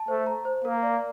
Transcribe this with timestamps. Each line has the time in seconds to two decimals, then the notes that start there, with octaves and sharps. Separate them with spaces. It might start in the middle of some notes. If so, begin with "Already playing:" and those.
Already playing: A5
0.08 A3 C5
0.26 A#5
0.45 C5
0.65 A#3 A#4
0.83 D5